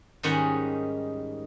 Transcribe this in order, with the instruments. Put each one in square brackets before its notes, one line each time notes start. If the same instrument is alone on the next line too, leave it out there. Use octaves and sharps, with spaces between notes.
[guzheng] G#2 D#3 G3 C#4 F#5 G#5